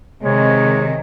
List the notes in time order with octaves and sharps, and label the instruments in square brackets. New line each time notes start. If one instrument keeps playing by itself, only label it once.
[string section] C3 D#3 [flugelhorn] G#3 [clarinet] C#5